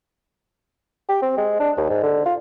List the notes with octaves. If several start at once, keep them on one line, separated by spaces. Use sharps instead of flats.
G4
C4
G#3
D4
D#2
G#2
D3
F4